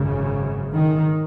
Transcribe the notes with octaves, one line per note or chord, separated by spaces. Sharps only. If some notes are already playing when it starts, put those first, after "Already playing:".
Already playing: G#1 F#2 C#3
D#3